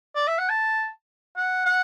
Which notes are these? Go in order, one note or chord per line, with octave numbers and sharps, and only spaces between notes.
D5
E5
F#5
A5
F#5
F#5